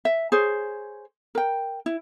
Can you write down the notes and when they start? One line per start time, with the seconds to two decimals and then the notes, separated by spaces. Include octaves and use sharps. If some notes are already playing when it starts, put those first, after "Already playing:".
0.05 E5
0.32 G#4 C5 C#5
1.35 A#4 G5
1.86 E4